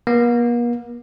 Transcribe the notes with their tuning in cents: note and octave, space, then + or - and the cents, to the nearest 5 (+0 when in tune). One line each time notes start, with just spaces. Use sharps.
A#3 +45